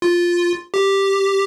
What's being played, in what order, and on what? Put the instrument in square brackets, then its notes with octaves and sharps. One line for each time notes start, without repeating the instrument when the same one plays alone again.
[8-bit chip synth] F4
G4